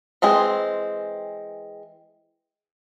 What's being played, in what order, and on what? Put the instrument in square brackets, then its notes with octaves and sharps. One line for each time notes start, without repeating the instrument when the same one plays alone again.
[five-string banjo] E3 G#3 C4 G#4